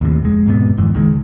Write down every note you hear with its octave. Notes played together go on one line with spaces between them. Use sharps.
D#2 A2 C3
F1 G#3
E1 G#2 C3 B3
G#1 F2 G#2 E3
C#2 D#3 G#3
C#2